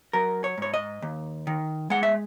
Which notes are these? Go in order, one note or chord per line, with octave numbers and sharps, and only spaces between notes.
F#3 A#4
C#5
G#2 C#5
D#5
D#2
D#3
G#3 F#5
E5